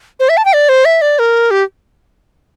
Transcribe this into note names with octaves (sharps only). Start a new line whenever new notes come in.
C5
E5
A5
G5
D5
C5
E5
D5
A#4
G4